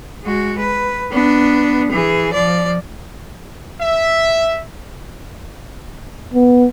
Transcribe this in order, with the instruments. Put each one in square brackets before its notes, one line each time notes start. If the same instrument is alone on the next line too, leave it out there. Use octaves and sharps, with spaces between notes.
[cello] G#3 F#4
B4
B3 D4
E3 G#4
F3 D5
[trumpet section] E5
[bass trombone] B3